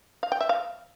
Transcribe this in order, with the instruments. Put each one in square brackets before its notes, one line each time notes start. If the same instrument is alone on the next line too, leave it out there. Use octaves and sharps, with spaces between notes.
[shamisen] F5
G5
E5
F5